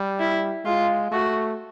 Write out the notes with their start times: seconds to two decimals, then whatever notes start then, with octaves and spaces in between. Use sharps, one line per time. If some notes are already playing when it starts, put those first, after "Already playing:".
Already playing: G3
0.19 E4
0.65 G#3 F4
1.11 A3 F#4